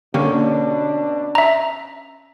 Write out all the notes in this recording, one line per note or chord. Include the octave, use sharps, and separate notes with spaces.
B2 D3 A#3 C#4 D4 G4
E5 A#5